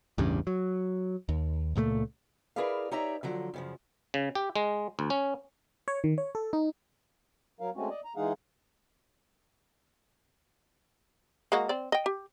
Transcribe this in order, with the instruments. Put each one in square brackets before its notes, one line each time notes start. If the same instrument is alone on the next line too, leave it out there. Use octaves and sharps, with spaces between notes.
[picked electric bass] A1 E2 G2 C#3
F#3
D#2
C#2 A#2 G3 A3
[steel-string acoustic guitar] E4 G#4 A#4 B4 D5 F5
D#4 G4 C#5 D5 E5 A#5
D3 F3 F#3
F#2 C#3 F3
[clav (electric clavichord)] C#3
G4
G#3
D2
C#4
[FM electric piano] C#5
D#3
C#5
A4
D#4
[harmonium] F#3 A#4 F5
G#3 A3 C4 C#4 F#4
D5 D#5
A#5
E3 G#3 D#4 G#4 F5 F#5
[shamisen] G#3 A#3 F#4
C4 D5
D#5 G5
G4